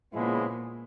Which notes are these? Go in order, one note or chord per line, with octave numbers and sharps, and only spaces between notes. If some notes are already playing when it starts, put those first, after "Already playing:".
A#2 C#3 F3 G#3 B3 E4